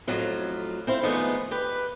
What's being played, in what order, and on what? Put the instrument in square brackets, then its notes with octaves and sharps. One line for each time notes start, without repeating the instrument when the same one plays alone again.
[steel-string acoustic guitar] F2 A2 F#3 F4
C4 E4 C5 F5
D3 D#3 F3 G#3 A3 B3
G4 B4